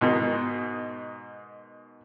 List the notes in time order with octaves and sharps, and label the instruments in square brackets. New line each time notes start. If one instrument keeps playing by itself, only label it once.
[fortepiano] G#2 B2 D#3